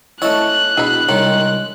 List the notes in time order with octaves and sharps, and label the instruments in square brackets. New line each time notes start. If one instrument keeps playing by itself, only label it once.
[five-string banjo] A3 C#4 [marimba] E4 [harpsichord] C#5 D#5 A5 [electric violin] F#6
[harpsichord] B2 [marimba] D4 E4 [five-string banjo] G#4 B5
[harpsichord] C2 C3 G#3 [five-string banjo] D#3 [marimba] C#5